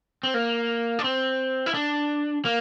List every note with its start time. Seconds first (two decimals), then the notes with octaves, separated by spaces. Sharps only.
0.23 C4
0.34 A#3
0.99 D4
1.04 C4
1.66 E4
1.74 D4
2.45 A#3